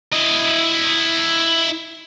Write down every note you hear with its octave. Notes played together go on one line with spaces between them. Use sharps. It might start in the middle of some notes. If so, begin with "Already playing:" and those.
E4 D#5